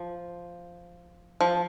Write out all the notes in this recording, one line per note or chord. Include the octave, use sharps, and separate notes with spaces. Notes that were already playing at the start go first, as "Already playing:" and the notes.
Already playing: F3
F3